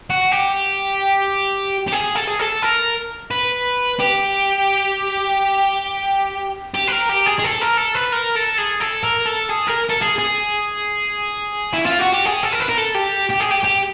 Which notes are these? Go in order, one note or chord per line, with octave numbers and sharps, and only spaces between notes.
F#4
G4
G4
G#4
A4
G#4
A4
A#4
B4
G4
G4
B4
A#4
G4
G#4
G#4
A4
A#4
A4
B4
A#4
A4
G#4
A4
A#4
A4
G#4
A#4
A4
G#4
G#4
E4
F4
F#4
G4
G#4
A4
A#4
B4
A#4
A4
G4
G4
G#4
G4
G4